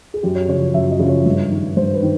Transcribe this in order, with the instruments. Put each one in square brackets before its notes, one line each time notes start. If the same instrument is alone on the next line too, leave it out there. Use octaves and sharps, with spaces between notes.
[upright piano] G#4
F#2 G4
C#5
C#3 F3 C#5
F#2 E5
D#5
C#3 F3
C#5
G2
D#3
G2 C5
B4
D#3